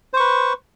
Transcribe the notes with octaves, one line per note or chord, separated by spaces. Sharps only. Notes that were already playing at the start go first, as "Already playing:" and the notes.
B4 C5 C#6